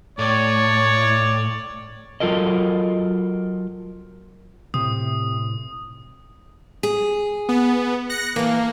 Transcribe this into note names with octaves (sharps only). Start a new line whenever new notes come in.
A2 C#5 D5
F#3 F4 A4 A#4 D#5
A2 C3 D#6
G#4
B3
F#6 A#6 C#7
A2 E3 A#3